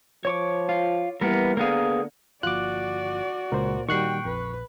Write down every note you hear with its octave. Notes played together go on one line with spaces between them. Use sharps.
F3 C#5 C#6 D6
F4
E3 G3 A#3 B3 A#4
D3 A#3 B3 G#4 A#4 F5
G1 F3 A#3 F4 F#4 D5 D6 F#6
C#2 A#2 A#4 C5
D#3 G3 F#4 G5 C#6 F#6 C7
A#1 F2 B4